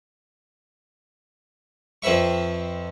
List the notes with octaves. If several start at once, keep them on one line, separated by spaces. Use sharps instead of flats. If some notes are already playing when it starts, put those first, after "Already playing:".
F2 C4 B4 E5 C#6